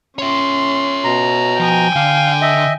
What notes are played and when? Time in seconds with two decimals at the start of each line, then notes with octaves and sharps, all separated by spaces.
0.19 C#4 C#5 E5 C6
1.04 B2 A#5
1.60 F3 G5 G#5
1.96 D3 F5
2.42 D#5 E5